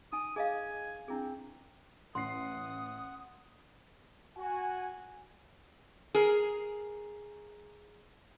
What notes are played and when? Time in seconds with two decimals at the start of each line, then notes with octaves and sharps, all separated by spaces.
0.13 D#4 G#5 D#6
0.36 G#4 D#5 F5 G#5
1.08 C4 D4 E4 G#4
2.15 A1 F#5 C6 D#6 C7
4.37 F#4 G#5
6.15 G#4 A#4